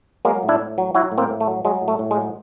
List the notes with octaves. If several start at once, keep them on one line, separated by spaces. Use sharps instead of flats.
F#3 G#3 A#3
A2
D4 E4
A2
F#3
F#3 E4 F#4
A2
A#3 C4
A2
A3
F#3
F#3 G#3
A2
A3
A2
G#3
F#3